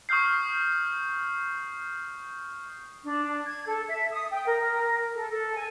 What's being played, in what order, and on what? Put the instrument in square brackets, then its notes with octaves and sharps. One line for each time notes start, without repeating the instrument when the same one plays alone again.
[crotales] C#6 D#6 F6 G6 C7
[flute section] D4
G#6
A4
E5
D#6
G5
A#4
A4
A4
G#5